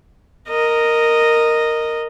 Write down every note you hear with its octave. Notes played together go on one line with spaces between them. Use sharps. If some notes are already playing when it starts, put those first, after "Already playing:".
A#4 D#5